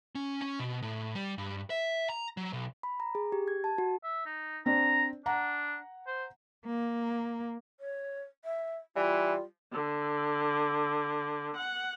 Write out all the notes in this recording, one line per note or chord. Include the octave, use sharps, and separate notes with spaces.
C#4
C#4
B2
A2
G3
G2
E5
A#5
F#3
B1
B5
A#5
G#4
G4
G#6
A5
F#4
E5
D#4
C4 D4 A#5
D4 F#5 A#5
C5
A#3
C#5
E5
E3 G3 F4
D3
F#5